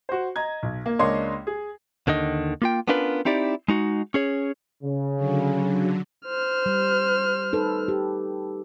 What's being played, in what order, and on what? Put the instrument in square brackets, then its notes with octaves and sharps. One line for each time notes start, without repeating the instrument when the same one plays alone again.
[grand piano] F#4 C5
D#5 A#5 G#6
B1
A#3
C#2 A#3 D4 C#5 D#5 C6
G#4
[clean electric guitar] D#2 D3 D#3 D#5
A#3 F4 G5
B3 C#4 D4 F4 A#4 B4
C4 D#4 E4 G4 D5
G#3 D#4 F#4
C#4 G#4 C#5
[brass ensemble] C#3
[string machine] D3 F#3
[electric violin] C5 F6
[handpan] G3
D#4 A4 B4
G4